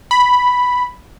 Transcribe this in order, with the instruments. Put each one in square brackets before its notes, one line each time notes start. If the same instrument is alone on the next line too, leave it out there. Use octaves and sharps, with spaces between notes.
[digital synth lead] B5